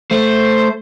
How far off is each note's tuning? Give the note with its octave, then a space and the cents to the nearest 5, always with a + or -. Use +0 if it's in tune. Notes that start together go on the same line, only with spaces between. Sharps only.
A3 +0 C5 +0